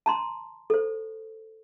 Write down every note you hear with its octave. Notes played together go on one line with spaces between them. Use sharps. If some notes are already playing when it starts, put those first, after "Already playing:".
A5 A#5 C6
A4 C5